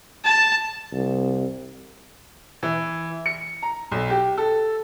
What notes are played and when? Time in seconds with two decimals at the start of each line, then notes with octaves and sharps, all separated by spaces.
0.24 A5
0.93 C2
2.63 E3
3.26 C#7
3.63 A#5
3.91 B1
4.10 G4
4.37 A4